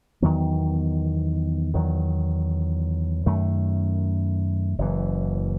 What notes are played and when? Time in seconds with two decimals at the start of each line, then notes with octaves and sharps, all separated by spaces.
0.22 E2 D#3 F#3 B3
1.74 E2 D#3 F#3
3.26 F#2 D#3 A3
4.78 F#1 F#2 E3